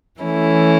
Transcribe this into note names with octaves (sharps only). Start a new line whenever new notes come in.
E3 A3 C#4 E4